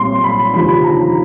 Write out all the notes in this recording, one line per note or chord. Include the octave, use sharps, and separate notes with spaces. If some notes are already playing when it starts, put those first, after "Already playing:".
Already playing: B1 A#2 G3 C4 C6
B5
F1 D#2 D3 F3 B5
A#5